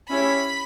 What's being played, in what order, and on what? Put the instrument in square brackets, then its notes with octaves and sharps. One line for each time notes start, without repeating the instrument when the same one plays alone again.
[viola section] C#4 E4 G4 C#5 [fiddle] B5